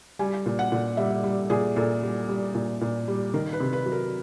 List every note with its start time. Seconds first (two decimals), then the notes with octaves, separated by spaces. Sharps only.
0.19 G3 G#5
0.46 A#2
0.59 F#5
0.72 A#2
0.97 G3 E5
1.24 G3
1.50 A#2 G#4
1.76 A#2 A4
2.02 G3
2.29 G3
2.55 A#2
2.81 A#2
3.08 G3
3.34 D#3 A#4
3.53 B4
3.60 C3
3.73 B4
3.86 F#3
3.92 A#4